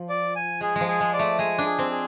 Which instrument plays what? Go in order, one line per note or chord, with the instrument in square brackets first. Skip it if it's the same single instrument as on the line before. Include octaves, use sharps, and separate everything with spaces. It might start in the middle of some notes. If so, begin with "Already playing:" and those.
Already playing: [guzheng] F3
[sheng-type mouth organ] D5
G#5
[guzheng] G#3 [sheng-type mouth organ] G#4
[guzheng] F3 G#3
[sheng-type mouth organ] G#4
[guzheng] G#3
[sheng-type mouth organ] D5
[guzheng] A3
[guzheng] G#3 [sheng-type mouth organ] G#5
[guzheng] D4
[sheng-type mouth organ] G#4
[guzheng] C4
[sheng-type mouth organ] G#4